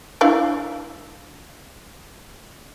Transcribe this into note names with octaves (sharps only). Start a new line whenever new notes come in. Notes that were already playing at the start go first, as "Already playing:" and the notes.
D4 E4 F5